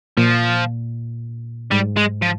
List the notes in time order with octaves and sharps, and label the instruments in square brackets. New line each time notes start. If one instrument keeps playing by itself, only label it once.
[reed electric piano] A#2 [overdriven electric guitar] F3
[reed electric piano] G#2 [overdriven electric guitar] G3
[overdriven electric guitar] G#3
F3